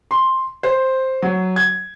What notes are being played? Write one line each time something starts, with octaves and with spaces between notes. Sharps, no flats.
C6
C5
F#3
G#6